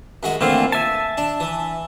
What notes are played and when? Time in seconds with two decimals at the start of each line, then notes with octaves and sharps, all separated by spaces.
0.23 F#2 G#3 F#4
0.41 D3 E3 A3 A#3 C4 F4
0.72 E5 G#5 A5
1.17 D4
1.40 E3